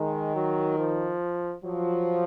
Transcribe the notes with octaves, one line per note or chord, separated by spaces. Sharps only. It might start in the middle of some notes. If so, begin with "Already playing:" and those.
Already playing: D#3 G#3
F#3
F3
F3 F#3